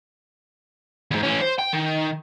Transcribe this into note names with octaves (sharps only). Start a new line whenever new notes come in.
E2 G#2
E3 C#4
C5
G5
D#3